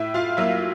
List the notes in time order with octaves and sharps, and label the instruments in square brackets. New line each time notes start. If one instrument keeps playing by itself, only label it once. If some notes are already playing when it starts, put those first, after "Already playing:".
Already playing: [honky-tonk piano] A2 E4 E5
F4 F5
F#3 A#3 E4 E5